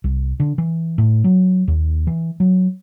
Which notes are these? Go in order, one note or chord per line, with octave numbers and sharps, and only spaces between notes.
C2
D3
E3
A2
F#3
D#2
E3
F#3